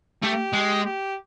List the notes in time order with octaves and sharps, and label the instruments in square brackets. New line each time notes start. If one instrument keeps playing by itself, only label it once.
[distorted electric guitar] A3 [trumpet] G4
[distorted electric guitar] G#3
[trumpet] G4